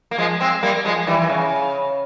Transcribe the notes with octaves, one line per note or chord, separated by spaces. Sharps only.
A#3
F3 G#3
G#3 C4
G3 A#3
F3 G#3
E3 G3
E3
C#3